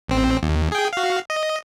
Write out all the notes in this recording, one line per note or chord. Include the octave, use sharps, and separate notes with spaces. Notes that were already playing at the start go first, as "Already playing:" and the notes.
A1 C4
D#2
G#4 G5
F#4 F5
D#5